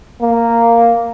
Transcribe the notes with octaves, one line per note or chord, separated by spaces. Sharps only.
A#3